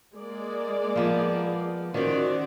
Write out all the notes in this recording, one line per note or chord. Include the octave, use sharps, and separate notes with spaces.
G#3 A#3 D5
F3 B3
D#3 C#4 F#4 C5 D5